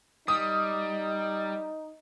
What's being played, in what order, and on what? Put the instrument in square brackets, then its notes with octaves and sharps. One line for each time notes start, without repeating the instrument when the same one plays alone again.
[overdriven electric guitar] G3 [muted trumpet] D#4 [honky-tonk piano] D#6